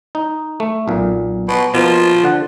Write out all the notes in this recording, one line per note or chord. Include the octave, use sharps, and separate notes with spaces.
D#4
A3
B1 A#2
B2
B2 F3 A#3
D3 F#5